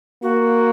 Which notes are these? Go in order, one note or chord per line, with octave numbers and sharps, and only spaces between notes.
A#3 F#4